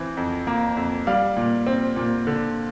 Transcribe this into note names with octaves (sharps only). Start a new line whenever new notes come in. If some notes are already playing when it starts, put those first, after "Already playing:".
Already playing: E3 C4
F2
A#3
F2
G3 D5 F5
A#2
C4
A#2
D3